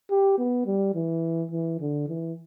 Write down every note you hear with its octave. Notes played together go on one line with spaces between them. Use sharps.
G4
B3
G3
E3
E3
D3
E3